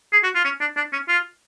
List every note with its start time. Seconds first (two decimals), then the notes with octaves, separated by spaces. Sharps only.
0.13 G#4
0.24 F#4
0.35 F4
0.45 C#4
0.61 D4
0.77 D4
0.93 C#4
1.08 F4